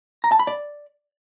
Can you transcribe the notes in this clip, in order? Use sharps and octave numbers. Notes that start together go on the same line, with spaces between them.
A#5
A5
B5
D5